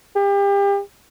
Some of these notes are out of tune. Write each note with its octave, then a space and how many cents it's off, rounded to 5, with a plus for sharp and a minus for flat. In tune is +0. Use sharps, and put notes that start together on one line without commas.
G4 +30